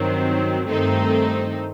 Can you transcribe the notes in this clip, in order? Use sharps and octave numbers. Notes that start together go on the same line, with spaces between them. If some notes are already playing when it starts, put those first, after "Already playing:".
Already playing: G2 D#3 F#3 C4
G2 D#3 A3 C4 D#4